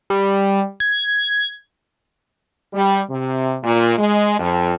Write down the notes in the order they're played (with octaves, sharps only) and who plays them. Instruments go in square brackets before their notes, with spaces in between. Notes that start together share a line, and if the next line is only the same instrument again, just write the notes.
[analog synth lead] G3
G#6
[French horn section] G3
C3
A#2
G#3
F2